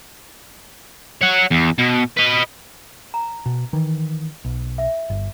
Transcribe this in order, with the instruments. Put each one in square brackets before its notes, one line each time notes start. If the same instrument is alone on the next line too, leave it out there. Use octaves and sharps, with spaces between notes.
[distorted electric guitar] C#5 F#5
E2
B2
B4 D#5
[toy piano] A#5
[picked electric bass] B2
D#3 E3
B1
[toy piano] E5
[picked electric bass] G1